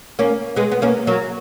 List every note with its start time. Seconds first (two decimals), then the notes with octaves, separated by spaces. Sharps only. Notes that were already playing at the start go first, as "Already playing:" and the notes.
0.19 A#3 C#4
0.56 G#3 B3
0.71 B3
0.82 A#3 C#4
1.07 F#3 A#3